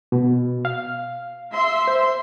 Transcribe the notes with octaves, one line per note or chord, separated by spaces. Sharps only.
B2
F5
E5 C6
C5